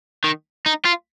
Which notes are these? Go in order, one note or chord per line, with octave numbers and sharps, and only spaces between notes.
D#3
D#4
F4